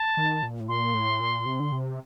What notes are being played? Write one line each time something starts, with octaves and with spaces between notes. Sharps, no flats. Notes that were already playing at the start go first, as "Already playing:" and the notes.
Already playing: A5
D#3
A#2
A2
A#2 C6
A2
A#2
C3
D3
C3